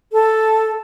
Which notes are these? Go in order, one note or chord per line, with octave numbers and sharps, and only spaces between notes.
A4